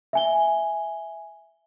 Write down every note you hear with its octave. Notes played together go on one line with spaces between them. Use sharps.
E5 G#5 G7